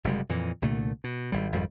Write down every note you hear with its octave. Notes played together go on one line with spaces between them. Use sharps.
F#1 C3 G3 G#3
F2 A#2 E3
C2 A#2 D3 A3
B2
G#1 G3
G#1 F2 G3